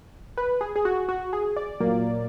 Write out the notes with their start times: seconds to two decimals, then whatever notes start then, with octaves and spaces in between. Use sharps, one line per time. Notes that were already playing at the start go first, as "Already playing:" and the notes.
0.38 B4
0.61 G#4
0.76 G#4
0.85 F#4
1.09 F#4
1.33 G#4
1.56 D5
1.80 A#2 F#3 A#3